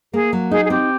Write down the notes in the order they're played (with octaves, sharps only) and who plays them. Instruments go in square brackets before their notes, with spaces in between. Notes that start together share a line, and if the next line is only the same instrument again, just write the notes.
[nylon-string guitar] A#3 [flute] G#4
[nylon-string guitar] F#3
[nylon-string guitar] D#4 [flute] G#4
[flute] G#4
[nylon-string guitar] C4 [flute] G4